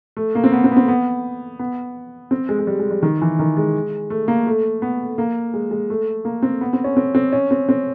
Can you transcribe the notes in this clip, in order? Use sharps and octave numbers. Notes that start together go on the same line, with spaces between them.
A3
A#3
C4
B3
C4
B3
C4
B3
B3
C4
G#3
G#3
G3
G#3
G3
D#3
E3
D#3
G#3
A3
A#3
A3
B3
A#3
G#3
G#3
A3
A#3
C4
B3
C4
C#4
C4
C4
C#4
C4
C4